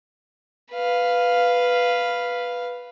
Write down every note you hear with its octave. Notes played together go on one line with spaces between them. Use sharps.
B4 F5